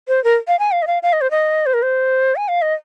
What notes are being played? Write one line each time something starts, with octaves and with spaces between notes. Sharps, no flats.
C5
A#4
F5
G#5
F5
D#5
F5
F5
D#5
C5
D#5
C5
A#4
C5
G#5
F5
D#5